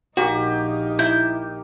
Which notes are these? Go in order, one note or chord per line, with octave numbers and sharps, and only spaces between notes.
A#1 A#3 D#4 F#4 G4
E4 G6